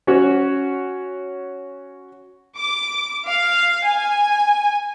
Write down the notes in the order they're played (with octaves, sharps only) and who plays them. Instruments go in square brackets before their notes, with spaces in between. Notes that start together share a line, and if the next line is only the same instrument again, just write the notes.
[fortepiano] C#4 F#4 C#5
[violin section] D6
F5
G#5